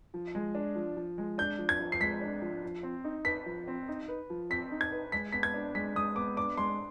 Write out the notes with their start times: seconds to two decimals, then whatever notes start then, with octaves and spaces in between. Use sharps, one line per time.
0.14 F3
0.35 G#3
0.55 D4
0.75 F3
0.97 F3
1.18 G#3
1.38 D4 G6
1.59 F3
1.69 G#6
1.80 F3
1.92 C7
2.00 G#3 B6
2.21 D4
2.42 F3
2.64 F3
2.83 C4
3.04 D#4
3.25 B4 B6
3.46 F3
3.68 C4
3.88 D#4
4.08 B4
4.30 F3
4.50 C4 B6
4.71 D#4
4.81 G#6
4.92 B4
5.12 G#3 B6
5.32 B3 B6
5.43 G#6
5.54 D4
5.75 G#3 B6
5.96 G#3 D#6
6.16 B3 D6
6.37 D4 D6
6.57 G#3 C6